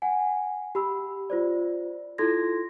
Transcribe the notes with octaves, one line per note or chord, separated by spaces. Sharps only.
F#5 G#5
G4 B5 E6
F4 C5 D5
E4 F4 A4 C6 G#6 A#6